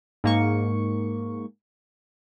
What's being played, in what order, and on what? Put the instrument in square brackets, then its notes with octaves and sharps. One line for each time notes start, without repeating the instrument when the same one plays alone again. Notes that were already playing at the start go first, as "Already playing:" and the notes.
[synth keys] G#2 A#3 C#6